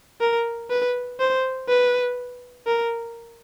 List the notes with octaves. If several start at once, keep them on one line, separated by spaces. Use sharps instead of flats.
A#4
B4
C5
B4
A#4